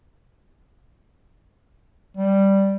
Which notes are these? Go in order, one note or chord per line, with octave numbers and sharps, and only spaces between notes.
G3